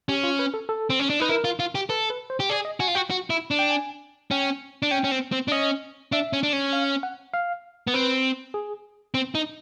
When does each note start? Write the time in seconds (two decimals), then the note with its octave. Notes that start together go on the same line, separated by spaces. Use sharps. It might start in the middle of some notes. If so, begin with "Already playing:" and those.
0.08 C#4 G4
0.23 F4
0.39 B4
0.54 A4
0.69 A4
0.90 C4
1.00 C#4
1.10 D4
1.20 D#4 B4
1.29 E4 A#4
1.44 F4
1.59 F4
1.75 G4
1.90 A4 B4
2.10 B4
2.30 C5
2.40 G4
2.50 G#4 D5
2.65 D#5
2.80 F#4 G#5
2.88 F4
2.95 F#4 G5
3.10 F#4
3.30 E4
3.51 D4
3.59 G5
3.70 G#5
4.31 C#4 G5
4.83 D4
4.91 C#4 G5
5.04 C#4
5.12 C4
5.32 C4
5.48 D4
5.52 C#4 D#5
6.12 D4 E5
6.33 C#4
6.43 D4
6.53 C#4
6.73 F5
7.03 F#5
7.34 F5
7.87 B3
7.94 C4 B4
8.54 G#4
9.14 C4
9.35 D#4